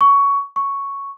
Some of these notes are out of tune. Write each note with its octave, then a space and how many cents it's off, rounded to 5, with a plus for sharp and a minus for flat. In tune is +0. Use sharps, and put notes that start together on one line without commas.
C#6 +15
C#6 +0